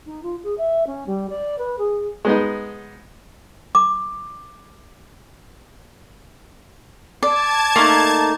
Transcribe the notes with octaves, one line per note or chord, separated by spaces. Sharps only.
D#4
F4
G#4
E5
C#4
G3
D5
B4
G#4
G#3 B3 D#4
D6
D5 A5 G#6
A3 A#3 D#4